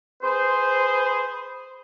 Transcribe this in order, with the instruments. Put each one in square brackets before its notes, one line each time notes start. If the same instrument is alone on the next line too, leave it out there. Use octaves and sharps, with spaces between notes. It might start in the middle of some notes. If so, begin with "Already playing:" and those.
[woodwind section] G#4 B4 C5